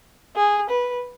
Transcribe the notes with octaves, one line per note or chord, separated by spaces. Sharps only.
G#4
B4